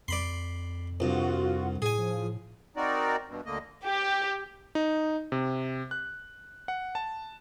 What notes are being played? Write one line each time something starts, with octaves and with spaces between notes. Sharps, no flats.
F2 D5 B5 C6
C2 G2 F4 F#4
A2 G#4 G#5
F3
C4 D#4 F#4 A#4 D5
G2 B2
D2 D3 A#3 D#5
G4
D#4
C3
F#6
F#5
A5